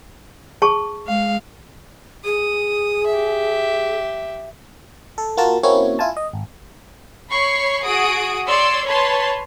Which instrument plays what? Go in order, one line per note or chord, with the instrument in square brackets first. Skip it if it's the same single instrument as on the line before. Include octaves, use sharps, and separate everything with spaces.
[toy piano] G#4 A5 C#6
[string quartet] G#3 F5
[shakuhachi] G#4 [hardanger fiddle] D#6
[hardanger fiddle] G4 E5
[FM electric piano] A4
A#3 F4 F#4 A#4 A5
A#3 C4 C#4 E4 F#4 C#5
E4 F4 G#5 A5
D#5
G#1
[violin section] C#5 B5 C#6 C7
F#4 G#4 D#6 D7
C#5 D5 C6 E6
B4 C#5 A5 C6